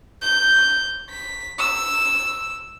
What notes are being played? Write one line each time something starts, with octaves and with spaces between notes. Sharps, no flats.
G6
B6
E6